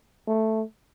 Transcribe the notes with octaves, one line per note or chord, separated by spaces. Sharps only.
A3